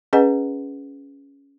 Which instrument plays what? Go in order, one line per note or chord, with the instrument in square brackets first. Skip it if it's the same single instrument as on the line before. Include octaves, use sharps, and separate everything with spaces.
[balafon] C#4 G#4 B4 D#5 F#5 G#5